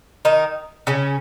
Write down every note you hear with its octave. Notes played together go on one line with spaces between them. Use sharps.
D#3 D#4
C#3 C#4